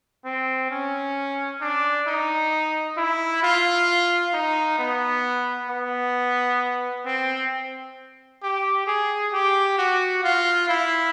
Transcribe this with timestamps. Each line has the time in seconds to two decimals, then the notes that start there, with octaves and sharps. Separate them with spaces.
0.25 C4
0.71 C#4
1.61 D4
2.07 D#4
2.97 E4
3.43 F4
4.34 D#4
4.79 B3
5.69 B3
7.06 C4
8.43 G4
8.87 G#4
9.33 G4
9.78 F#4
10.24 F4
10.68 E4